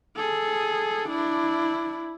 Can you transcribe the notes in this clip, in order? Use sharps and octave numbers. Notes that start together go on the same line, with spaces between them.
G#4 A4
D4 E4